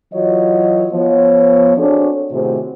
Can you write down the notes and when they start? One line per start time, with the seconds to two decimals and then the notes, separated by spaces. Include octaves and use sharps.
0.14 E3 F#3 F4 F#4 C#5 D#5
0.92 F3 B3 C#5
1.77 C4 D4 F#4 G#4 A4 C#5
2.31 A2 C3 D#3 F#4 G#4 C5